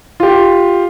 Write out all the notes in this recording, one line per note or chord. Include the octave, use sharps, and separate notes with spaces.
F4 G4